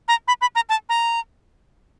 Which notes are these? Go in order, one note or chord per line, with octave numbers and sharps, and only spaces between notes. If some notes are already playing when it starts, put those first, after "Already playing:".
A#5
B5
B5
A#5
A5
A#5